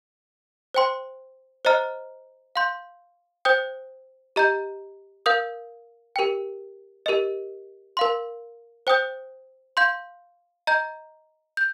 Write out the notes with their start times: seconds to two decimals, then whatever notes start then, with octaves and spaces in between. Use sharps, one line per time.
0.74 C5 G5 C6
1.65 C5 D#5 A#5 F6
2.56 F5 C6 G6
3.45 C5 G5 D#6 G6
4.36 G4 D#5 A#5 G6
5.26 A#4 F5 D#6 G6
6.16 G4 A#4 G5
7.06 G4 A#4 D#5
7.97 A#4 F5 C6
8.87 C5 G5 D#6 G6
9.77 F5 C6 G6
10.67 D#5 A#5 G6
11.57 G6